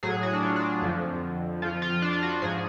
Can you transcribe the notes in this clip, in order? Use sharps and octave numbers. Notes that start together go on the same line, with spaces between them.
A2 F#3 G#4
F#4
D4
F4
D4
F2 D3 F3
F2 F3 F4
F4
D4
F4
F#4
G#2 F3 G#4